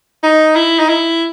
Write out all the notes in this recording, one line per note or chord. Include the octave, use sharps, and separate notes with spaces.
D#4
E4
D#4
E4